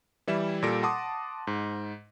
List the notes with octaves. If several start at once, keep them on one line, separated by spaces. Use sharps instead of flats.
E3 G3 E4 E7
A#2 G3 A4 A#6 D7
F#5 A5 C6 D6 D#6
G#2